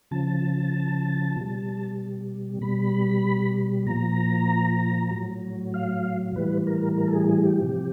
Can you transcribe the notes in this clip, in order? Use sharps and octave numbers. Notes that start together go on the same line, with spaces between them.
C#3 F3 A5
B2 G3
B2 G3 B5
A#2 F3 A#5
A2 F#3
F5
A2 E3 G3 B4
A#4
A#4
A4
G#4
G#4
G4
C3 F3